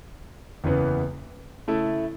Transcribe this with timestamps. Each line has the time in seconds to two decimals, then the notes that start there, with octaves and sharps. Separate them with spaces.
0.64 F#1 E2 C#3 E3 B3
1.68 C#3 A3 E4 A4